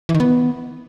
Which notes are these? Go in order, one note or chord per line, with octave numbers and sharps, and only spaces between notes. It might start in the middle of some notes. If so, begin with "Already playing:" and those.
E3
D#3
B3